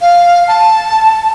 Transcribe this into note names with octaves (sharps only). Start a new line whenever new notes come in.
F5
A5